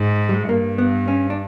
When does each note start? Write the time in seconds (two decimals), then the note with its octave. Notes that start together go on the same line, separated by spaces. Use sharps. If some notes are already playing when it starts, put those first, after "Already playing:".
Already playing: G#2
0.29 G3
0.34 G#3
0.49 G2 A#3
0.78 B3
1.08 C#4
1.30 D4